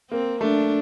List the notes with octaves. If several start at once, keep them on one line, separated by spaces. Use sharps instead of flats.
A#3 C4
A3 D4